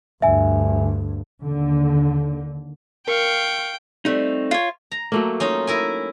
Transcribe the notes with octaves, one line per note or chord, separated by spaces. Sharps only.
D2 G2 E5 G#5
D#2 D3
A#4 F5 G5 C#6
G3 A3 C4 D#4
F4 C#5
A#5
F#3 A3 A#3
C#4 D#4 F4
E4 A#4 G#5